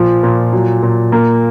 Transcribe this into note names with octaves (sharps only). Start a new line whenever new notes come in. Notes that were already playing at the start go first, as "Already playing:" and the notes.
Already playing: A#2 F3
A#2
F#3
A#2
A#3